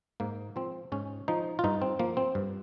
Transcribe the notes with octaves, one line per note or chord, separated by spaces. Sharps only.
G#2 A#3
F3 C4
G#2 C#4
F3 D#4
F4
G2 D#4
C4
F3 A#3
C4
G2